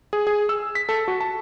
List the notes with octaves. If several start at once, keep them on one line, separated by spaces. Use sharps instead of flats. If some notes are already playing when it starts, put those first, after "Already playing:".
G#4
G#4
E6
B6
A4
F#4
A5